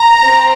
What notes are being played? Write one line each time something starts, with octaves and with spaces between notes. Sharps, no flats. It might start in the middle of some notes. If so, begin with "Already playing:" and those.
Already playing: A#5
C4